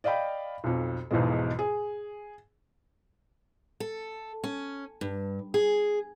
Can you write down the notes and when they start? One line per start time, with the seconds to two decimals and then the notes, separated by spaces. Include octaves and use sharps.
0.04 D5 D#5 F5 G5 B5
0.64 B1 F2
1.11 B1 E2 G#2 B2 F3 G#3
1.59 G#4
3.80 A4
4.44 C#4
5.01 G2
5.54 G#4